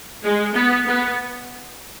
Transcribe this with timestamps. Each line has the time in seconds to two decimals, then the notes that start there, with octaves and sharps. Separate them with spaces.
0.22 G#3
0.53 B3
0.86 B3